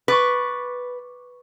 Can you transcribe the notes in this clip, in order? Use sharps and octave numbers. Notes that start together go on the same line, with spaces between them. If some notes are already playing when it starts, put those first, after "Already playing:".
B4 C#6 D6 A6